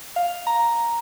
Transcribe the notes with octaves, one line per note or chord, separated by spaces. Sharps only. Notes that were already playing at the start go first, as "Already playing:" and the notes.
F5
A#5